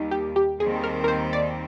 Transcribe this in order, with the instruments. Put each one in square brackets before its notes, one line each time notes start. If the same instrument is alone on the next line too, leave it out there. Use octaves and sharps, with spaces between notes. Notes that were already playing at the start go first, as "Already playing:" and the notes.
Already playing: [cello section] D#2 D#3 G3 [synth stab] D#4
[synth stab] G4
G4
[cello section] D#2 D#3 G3 C4 [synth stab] G#4
[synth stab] A#4
A#4
C5
D5